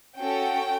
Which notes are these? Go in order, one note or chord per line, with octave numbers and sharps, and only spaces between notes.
C#4 F#4 A4 G5